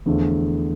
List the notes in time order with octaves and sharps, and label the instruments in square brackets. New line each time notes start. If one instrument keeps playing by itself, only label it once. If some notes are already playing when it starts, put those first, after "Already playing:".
[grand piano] E2 D3 F3 A3